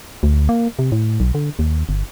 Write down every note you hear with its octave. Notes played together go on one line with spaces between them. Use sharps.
D2
A#3
C3
A2
B1
D3
D#2
G1